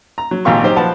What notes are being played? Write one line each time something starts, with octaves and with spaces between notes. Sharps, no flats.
A#5
F#3
G#1 A#2 F4 G4 F5 C#6
F#3 D#4 G4 C5
F3 B4 F#5 A5